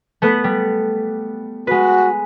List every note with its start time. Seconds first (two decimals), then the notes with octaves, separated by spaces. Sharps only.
0.22 A3 B3 B4
0.44 G3
1.67 G#3 F#4 B4